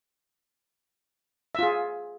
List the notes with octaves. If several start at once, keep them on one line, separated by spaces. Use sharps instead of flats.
F4 G#4 E5